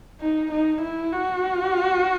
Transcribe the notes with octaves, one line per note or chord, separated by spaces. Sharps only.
D#4
D#4
E4
F#4